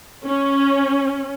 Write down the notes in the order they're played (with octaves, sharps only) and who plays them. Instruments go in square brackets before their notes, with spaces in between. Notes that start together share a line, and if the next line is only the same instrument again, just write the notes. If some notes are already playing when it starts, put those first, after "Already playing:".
[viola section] C#4